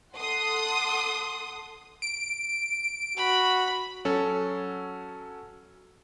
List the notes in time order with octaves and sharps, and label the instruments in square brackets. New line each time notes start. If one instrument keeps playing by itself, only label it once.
[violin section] A4 F#5 C6 D#6
[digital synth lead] D7
[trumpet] F#4 [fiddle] B5
[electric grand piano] F#3 C#4 A4